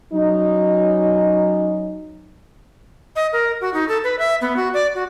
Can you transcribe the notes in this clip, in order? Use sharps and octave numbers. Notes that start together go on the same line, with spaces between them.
F#3 C#4 D#4
D#5
A#4
F#4
D#4
A4
B4
E5
B3
F#4
D5
F#4